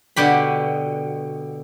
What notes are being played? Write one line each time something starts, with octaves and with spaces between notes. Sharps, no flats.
B2 D3 G4 B5